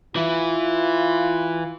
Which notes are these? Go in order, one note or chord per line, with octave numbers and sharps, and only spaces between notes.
E3 E4 F4